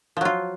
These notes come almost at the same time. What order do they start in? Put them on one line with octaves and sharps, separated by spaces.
F3 F#3 F4